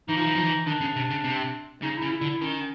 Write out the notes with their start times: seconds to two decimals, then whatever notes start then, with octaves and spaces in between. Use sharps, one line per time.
0.09 E3 D#4
0.17 F3
0.27 E3
0.35 F3
0.45 E3
0.67 D#3 D4
0.81 C#3
0.96 C3
1.10 C#3
1.24 C3
1.82 C#3 D#4
1.97 C#3 E4
2.12 E4
2.21 D3
2.26 E4
2.41 D#3 C#4